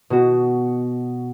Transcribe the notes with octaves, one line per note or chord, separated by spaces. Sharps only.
B2 F#4